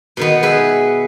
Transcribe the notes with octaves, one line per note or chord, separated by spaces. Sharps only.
B2 D#3 B3
G#4 B4 E5